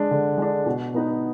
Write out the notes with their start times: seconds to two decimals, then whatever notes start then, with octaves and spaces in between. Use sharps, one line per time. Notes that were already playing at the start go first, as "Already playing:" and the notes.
Already playing: G#3 D4
0.11 D3
0.38 G#3 D4
0.66 B2
0.94 B3 D#4 B4